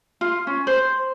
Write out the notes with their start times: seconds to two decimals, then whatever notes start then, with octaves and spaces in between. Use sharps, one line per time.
0.21 F4
0.47 C#4
0.67 C5